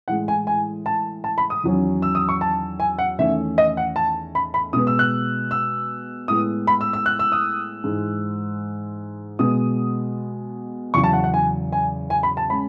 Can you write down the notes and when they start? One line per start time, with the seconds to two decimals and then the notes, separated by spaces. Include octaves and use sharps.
0.08 A2 E3 G#3 F#5
0.28 G#5
0.47 G#5
0.86 A5
1.24 A5
1.38 B5
1.50 D#6
1.63 E2 D#3 F#3 C#4
2.02 E6
2.15 D#6
2.29 C#6
2.41 A5
2.80 G#5
2.98 F#5
3.18 E2 D#3 A3 C#4 E5
3.58 D#5
3.77 F#5
3.96 A5
4.35 B5
4.54 B5
4.73 B2 G#3 B3 D#6
4.87 E6
4.99 F#6
5.51 E6
6.28 A2 G#3 B3 D#6
6.67 B5
6.81 E6
6.93 E6
7.06 F#6
7.19 E6
7.32 D#6
7.84 G#2 E3 G#3
9.39 B2 G#3 B3 D#6
10.94 E2 C#3 F#3 C#6
11.04 A5
11.13 F#5
11.24 F#5
11.34 G#5
11.72 G#5
12.10 G#5
12.23 B5
12.37 A5
12.49 G#3 C#4 B5